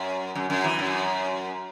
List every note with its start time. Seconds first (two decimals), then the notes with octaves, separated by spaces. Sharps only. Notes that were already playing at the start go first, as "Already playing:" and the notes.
Already playing: F#2
0.35 F#2
0.50 F#2
0.64 E3
0.79 F#2